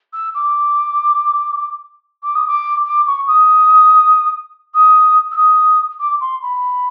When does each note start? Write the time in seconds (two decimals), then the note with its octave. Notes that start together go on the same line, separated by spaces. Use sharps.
0.13 E6
0.35 D6
2.23 D6
2.35 D#6
2.47 D6
2.86 D6
3.07 C#6
3.27 D#6
4.74 D#6
5.32 E6
5.37 D#6
6.00 D6
6.20 C6
6.42 B5